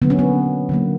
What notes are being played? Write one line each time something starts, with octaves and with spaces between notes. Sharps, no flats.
D3 F#3 A#3 B3
C#4
B3
D3 F#3 A#3